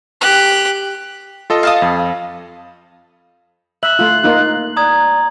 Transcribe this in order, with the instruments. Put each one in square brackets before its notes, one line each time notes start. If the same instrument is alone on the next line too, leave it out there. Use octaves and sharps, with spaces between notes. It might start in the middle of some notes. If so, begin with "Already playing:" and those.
[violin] G4 F#6
[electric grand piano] F4 A4 D#5
[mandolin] F5 A5 D#6
[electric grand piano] F2
[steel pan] E5 [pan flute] F#6 [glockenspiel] F#7
[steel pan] A3 F4 [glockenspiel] F#7
[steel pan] A#3 D#4 F4
[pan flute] D5 [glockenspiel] A#5 D#6 G#6